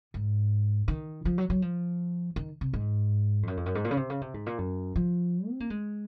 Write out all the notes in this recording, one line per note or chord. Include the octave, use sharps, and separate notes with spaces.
G#2
D#3
F3
F#3
F#3
F3
D#3
C3
G#2
F2
F#2
F2
F#2
G#2
A#2
C#3
C3
C#3
C3
G#2
A#2
F#2
F3
C4
A#3
G#3